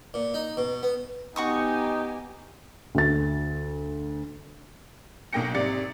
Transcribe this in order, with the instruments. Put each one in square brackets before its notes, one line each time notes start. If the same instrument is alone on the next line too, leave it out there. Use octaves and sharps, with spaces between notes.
[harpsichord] A#2
D#4
B2
B3
[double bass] B3 [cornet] D#4 [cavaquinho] F#4 C#6 D#6 [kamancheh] G4 G#5
[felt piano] D2 A6
[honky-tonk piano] B1 B2 A#3 G5 A#6 C#7
G#1 C3 D5 A6 C#7